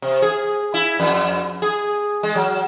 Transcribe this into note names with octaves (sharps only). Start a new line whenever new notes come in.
C3
G#4
E4
F2
G#4
G#3
F#3